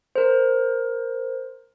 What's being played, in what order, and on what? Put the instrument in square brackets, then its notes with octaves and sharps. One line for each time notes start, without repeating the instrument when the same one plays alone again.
[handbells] A#4 C5